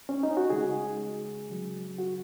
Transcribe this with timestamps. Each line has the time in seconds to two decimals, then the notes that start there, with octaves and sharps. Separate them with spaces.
0.09 C#4
0.23 D#4
0.37 F#4
0.50 C#3 G#3 G#4
1.49 C#3 F#3
1.98 F#4